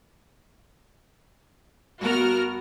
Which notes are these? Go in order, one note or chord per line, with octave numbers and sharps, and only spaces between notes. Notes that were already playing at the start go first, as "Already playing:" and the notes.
G2 B3 F#4 A#4 F6